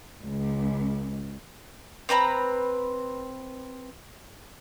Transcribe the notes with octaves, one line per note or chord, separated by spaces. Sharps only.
C#2
C4 B4 A#5 B5